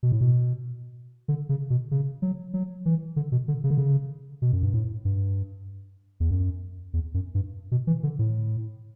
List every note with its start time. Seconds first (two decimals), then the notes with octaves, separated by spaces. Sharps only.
0.03 B2
0.12 A2
0.21 B2
1.28 D3
1.49 C#3
1.70 B2
1.91 C#3
2.22 F#3
2.54 F#3
2.85 E3
3.16 D3
3.32 B2
3.48 D3
3.64 C#3
3.70 D3
3.78 C#3
4.42 B2
4.53 F#2
4.63 G2
4.74 A2
5.05 G2
6.20 E2
6.31 F#2
6.93 E2
7.14 F#2
7.35 G2
7.71 B2
7.87 E3
8.03 D3
8.19 A2